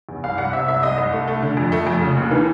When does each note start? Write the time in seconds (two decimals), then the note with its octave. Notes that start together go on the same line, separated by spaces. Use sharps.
0.09 E2
0.24 C2 F5
0.38 C2 F#5
0.53 C3 E5
0.68 C2 E5
0.83 C2 D#5
0.98 C2
1.12 A3
1.28 A3
1.42 D3
1.57 F2
1.72 A3
1.87 F2
2.01 C#3
2.17 D#2
2.31 E3